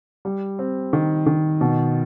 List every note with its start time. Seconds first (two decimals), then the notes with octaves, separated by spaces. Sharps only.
0.25 G3
0.59 C4
0.93 D#3
1.26 D#3
1.61 B2